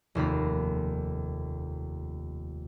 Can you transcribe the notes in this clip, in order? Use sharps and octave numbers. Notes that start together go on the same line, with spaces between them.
F1 D#2 F4 B5